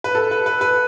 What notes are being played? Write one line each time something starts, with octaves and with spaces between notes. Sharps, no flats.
B4
A4
B4
B4
B4